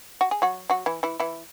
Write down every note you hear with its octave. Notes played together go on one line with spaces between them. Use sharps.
F#4
G#4
F#3 F#4
F#3 F#4
E3 E4
E3 E4
E3 E4